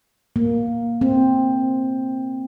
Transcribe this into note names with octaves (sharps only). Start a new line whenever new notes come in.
A#3
C4